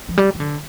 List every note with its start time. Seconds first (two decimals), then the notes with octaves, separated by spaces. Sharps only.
0.09 F3
0.18 G3
0.35 F3
0.40 D3